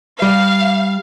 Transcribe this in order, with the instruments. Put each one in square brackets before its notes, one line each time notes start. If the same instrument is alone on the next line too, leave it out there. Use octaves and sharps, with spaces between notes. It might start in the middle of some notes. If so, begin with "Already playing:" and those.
[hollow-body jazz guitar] G3 [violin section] F5